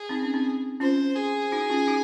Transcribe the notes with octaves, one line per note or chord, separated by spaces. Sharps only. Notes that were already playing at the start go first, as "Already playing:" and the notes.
Already playing: G#4
C4 D#4
C#4
C4 D#4
C#4 F4 C5
G#4
D#4 F#4
C#4 F4
D#4 F#4